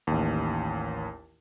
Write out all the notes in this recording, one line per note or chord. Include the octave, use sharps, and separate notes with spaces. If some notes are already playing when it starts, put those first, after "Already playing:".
A1 D#2